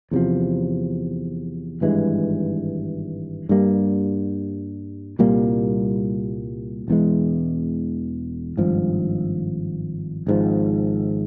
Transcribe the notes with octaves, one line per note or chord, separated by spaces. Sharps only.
E2 C3 F3
G#1 G2 E3 G#3
G2 G3 A#3
C2 A#2 G3 A#3
E1 E2 E3 G#3
G#1 G2 F3
G#1 G#2 F3